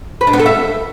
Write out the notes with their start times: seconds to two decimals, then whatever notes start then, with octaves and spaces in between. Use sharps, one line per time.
0.21 B4
0.27 D4
0.33 B3
0.40 A4
0.46 E5